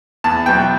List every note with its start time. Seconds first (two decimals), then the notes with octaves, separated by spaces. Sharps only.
0.24 E2 A5
0.46 B2 F#3 G5